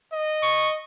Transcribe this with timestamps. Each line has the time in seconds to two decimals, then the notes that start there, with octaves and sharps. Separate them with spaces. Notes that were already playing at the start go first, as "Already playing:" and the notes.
0.12 D#5
0.43 C#6